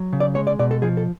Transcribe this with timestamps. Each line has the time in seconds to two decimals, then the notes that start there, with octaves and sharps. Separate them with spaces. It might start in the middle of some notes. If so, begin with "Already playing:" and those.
Already playing: F#3
0.13 C#3
0.20 D5
0.35 G#3 C#5
0.47 D5
0.59 B2 D5
0.71 A4
0.82 F3 G#4
0.97 A4